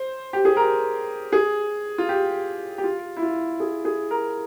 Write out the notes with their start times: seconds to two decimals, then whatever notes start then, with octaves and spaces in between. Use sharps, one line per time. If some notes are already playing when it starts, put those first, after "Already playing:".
Already playing: C5
0.33 G4
0.45 G#4
0.57 A#4
1.33 G#4
1.98 F4
2.09 G4
2.78 G4
2.84 F4
3.17 E4
3.23 F4
3.60 G#4
3.85 G#4
4.11 A#4